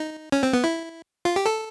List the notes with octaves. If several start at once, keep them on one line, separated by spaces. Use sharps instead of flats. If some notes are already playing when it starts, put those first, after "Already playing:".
Already playing: D#4
C#4
C4
B3
E4
F4
G4
A4